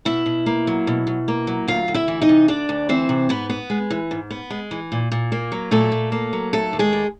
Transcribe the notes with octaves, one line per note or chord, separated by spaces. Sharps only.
B2 E4 E5
B2
A#3
F#3
B2
B2
A#3
F#3
D2 F4 F5
D2
E4 E5
E3
D#4 D#5
C3
D2 D4 D5
D2
E3 C4 C5
C3
G#2 B3 B4
B3
G#3
E3
G#2
B3
G#3
E3
A#2
A#2
A#3
F#3
A#2 A3 A4
A#2
A#3
F#3
D#2 A3 A4
D#2
G#3 G#4
G3